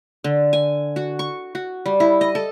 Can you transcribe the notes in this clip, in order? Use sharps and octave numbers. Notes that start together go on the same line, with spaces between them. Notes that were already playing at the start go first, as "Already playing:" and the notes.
D3
G#5
F#4
C#6
F#4
G3
E4
D#5
A4